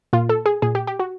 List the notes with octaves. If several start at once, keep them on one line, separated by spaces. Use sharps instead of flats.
A#2 F4
A4
G#4
A#2 G#4
G4
G4
F#4